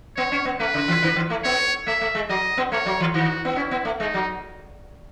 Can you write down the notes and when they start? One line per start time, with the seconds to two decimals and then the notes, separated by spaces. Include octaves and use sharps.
0.16 B3 C#5
0.32 C#4
0.45 B3
0.60 A3 B4
0.74 C#3
0.88 E3
1.02 D#3
1.16 E3
1.30 A3
1.44 B3 C#5
1.87 A3 E5
2.01 A3
2.15 G#3
2.29 F#3 D#5
2.57 B3
2.72 A3 C#5
2.86 F#3
3.00 E3
3.14 D#3 F#4
3.45 B3
3.56 C#4 E4
3.71 B3
3.85 A3
4.00 G#3 D#4
4.14 F#3